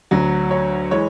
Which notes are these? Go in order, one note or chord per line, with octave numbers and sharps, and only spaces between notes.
D2 D3 F#3
C#5
E3 G#3 C#5